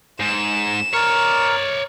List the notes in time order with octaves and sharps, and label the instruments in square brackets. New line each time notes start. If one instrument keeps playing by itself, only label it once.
[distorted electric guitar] G#2 [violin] E7
[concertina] A#4 [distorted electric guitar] C#5 D5